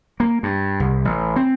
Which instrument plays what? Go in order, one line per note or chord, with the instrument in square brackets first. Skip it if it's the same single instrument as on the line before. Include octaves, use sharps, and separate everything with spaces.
[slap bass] A#3
G2
C2
A1
C4